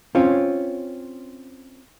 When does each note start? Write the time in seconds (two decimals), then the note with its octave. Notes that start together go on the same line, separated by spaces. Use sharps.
0.15 C4 C#4 F4 C#5